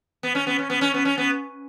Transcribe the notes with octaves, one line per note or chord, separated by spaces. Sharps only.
B3
C#4
B3
C#4
B3
C#4
B3
C#4
B3